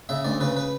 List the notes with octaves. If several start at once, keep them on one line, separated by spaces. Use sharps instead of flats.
C#3 E5
D2 D5
C#3 B4
B4